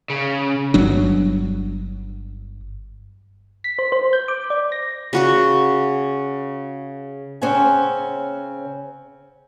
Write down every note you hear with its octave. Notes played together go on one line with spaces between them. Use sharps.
C#3
G1 F#3 D4
B6
C5
C5
G6
D6
D5
A#6
C#3 F#4 C#6
C#3 C4 C#4 C5 F#5 G#5